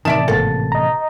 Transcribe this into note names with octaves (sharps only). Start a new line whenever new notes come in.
A1 C3 D#3 D5 E5 A5
G#1 A#3 A4
D#5 A#5